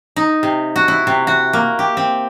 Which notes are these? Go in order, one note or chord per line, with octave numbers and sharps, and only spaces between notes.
D#4
C3
F#4
E4
C3
F#4
A#3
G4
C4